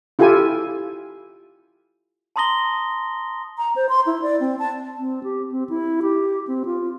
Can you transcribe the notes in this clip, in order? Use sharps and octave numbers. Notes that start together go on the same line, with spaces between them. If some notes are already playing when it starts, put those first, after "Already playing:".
E4 F4 G4 A4 G#5
A5 A#5 C6 D#6 A#6 G7
A#5
C5
C6
E4
D5
C4
A5
C4
G4
C4
E4
G4
C4
F4